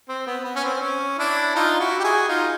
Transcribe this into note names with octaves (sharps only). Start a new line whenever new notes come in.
C4
B3
B3
C#4
C4
C#4
D4 E4
D#4 F4
E4 F#4
G4
F#4 G#4
D#4 F4